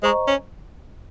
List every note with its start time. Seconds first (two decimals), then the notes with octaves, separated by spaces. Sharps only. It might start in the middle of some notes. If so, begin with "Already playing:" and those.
0.03 G#3 C5 D#5 A#5 C#6
0.28 C#4